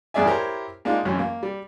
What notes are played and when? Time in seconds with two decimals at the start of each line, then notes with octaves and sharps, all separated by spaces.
0.14 E2 G2 G#4 D5 E5 G#5
0.26 E4 G4 A#4 C5 C#5
0.85 G#3 A#3 D4 D#4 F4
1.05 G#1 F#2 E3 C#4
1.19 A#3
1.43 G3